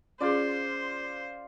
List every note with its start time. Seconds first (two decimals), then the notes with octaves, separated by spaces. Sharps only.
0.21 C#4 F4 G#4 C5 D5